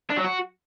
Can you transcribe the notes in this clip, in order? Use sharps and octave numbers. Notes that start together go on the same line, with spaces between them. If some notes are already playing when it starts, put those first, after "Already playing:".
D4
F#3
F#4